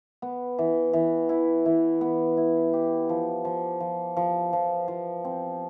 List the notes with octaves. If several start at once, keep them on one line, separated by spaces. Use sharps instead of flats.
B3
E3
E3
E4
E3
B3
E4
G4
F3
F3
F3
F3
F3
F3
C4